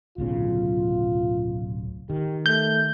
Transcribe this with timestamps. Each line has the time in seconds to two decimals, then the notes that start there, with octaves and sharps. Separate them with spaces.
0.18 D1 B1 C#3 F4
2.10 D#3 G4
2.46 A3 G6